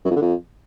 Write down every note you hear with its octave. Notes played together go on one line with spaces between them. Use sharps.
F#2
F2
D3
F2